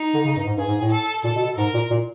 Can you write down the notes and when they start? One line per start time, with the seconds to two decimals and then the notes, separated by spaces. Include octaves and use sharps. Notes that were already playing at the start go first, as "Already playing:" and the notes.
Already playing: D#4
0.14 D3
0.25 C#3
0.36 G2
0.47 G#2
0.57 G2 G#4
0.68 G#2
0.79 A2
0.91 A4
1.24 A#2 A4
1.36 B2
1.46 B2
1.57 G#2 A#4
1.74 A#2
1.91 A#2